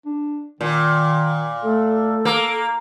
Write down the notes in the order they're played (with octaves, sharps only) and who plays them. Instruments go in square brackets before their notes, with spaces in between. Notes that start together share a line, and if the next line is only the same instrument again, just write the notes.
[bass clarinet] D4
[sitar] A#2 [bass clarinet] D#3
[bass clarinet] A3 [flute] A4
[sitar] A#3